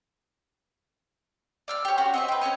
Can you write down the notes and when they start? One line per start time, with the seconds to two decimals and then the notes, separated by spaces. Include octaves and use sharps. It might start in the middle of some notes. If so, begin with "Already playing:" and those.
1.68 D5 E6 F6
1.85 G4 C#5
1.98 C#4 F#4
2.14 C4 D#5 E5
2.28 B4 G5
2.41 C#4 G4 C#5 D#5